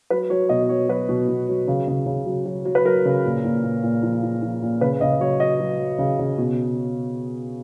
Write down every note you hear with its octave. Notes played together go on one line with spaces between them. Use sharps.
F#3 B4
F#3 C#5
B2 D#5
F#3 C#5
F#3 B4
B2
B2
F#3
C#3
C#3
C#3
F#3
F#3
F#3
B4
F#3 A#4
C#3
A#2
A#2
A#2
A#2
F3
F3
F3
A#2
C#3 B4
C#3 D#5
F#3 C#5
F#3 D#5
F#3
F#3
C#3
C#3
B2